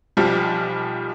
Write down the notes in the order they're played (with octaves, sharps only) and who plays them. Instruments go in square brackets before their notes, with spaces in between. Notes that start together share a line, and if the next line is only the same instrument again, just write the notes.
[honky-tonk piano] B1 F3 G3